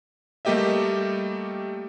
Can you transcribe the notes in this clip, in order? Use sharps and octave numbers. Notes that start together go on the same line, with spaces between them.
G3 A3 A#3 G4 D#5 E5